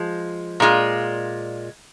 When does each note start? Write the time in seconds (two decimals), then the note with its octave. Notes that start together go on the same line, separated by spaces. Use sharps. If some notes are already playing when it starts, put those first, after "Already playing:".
Already playing: F3 G#3
0.60 A#2 G#3 F4